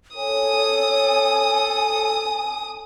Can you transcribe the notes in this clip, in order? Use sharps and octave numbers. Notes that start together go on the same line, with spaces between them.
A4 C#5 G#5 D#6